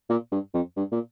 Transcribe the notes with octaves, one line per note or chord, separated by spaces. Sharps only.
A#2
G2
F2
G2
A#2